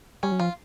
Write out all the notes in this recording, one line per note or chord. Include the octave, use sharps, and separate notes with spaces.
G3 C#4
F#3
F3 F4